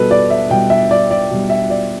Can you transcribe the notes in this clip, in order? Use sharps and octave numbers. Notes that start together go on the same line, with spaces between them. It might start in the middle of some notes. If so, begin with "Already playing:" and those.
Already playing: B2 G3 A4 B4
D5
E5
B2 G3 G5
E5
D5
D5
B2 G3
E5
D5